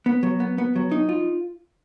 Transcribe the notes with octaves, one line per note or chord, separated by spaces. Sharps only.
B3
F#3
B3
B3
F#3
D#4
F4